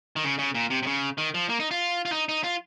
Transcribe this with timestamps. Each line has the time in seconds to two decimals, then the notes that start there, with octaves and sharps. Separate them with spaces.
0.16 D#3
0.24 C#3
0.39 C#3
0.54 A#2
0.70 C3
0.83 C3
0.87 C#3
1.18 D#3
1.34 F3
1.49 A#3
1.60 D#4
1.71 F4
2.05 F4
2.12 D#4
2.29 D#4
2.44 F4